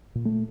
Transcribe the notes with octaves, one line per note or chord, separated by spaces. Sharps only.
A#2
A3